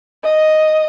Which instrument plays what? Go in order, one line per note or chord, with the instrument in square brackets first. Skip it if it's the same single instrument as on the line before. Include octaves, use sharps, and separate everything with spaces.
[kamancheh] D#5